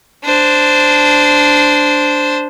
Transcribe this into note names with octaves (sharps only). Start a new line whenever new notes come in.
D4 C5